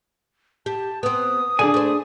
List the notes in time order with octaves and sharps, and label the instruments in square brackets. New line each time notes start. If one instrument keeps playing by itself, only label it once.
[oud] G4 [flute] A5
[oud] B3 C4 [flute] D#6
[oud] D3 [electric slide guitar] D4 G#4 G#5
[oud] A3 C5